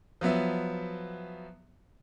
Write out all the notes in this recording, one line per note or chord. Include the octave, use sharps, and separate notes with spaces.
F3 F#3 B3 E5